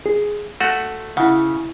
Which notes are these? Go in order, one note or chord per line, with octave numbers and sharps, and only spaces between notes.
G#4
A3 F#4 F#5
C#3 E4 F#5